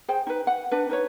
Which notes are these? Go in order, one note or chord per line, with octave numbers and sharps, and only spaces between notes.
G#4 C5 G5
D#4 B4
F#5
D4 B4
D#4 B4 C#5